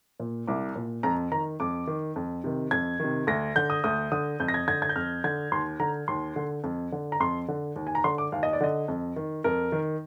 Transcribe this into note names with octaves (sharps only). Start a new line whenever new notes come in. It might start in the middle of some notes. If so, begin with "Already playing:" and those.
A#2
C2 D6
A#2
F2 A#5
D#3 A#5
F2 D6
D#3
F2
C3 D#3
F2 G#6
C3 D#3
D2 A#6
D3 G6
D#6
D2 D#6
D3 D#6
F2 G6
A#6
G#6
D3 G#6
G#6
G6
F2 F6
D3 G#6
D#2 C6
D3 A#5
D#2 C6
D3
F2
D3
A#5
F2 C6
D3
D#2
G#5
A#5
D3 C6
D6
D#2 F5
D#5
D5
D3 D#5
F2
D#3
F2 A#4
D#3